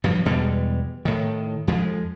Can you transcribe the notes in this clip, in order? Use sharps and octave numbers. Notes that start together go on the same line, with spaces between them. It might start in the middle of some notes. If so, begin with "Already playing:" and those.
G2 F3 F#3
E2 B2 G3 G#3
A2 D#3
F2 F3 G#3